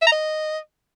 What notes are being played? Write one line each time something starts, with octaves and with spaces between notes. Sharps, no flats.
E5
A#5
D#5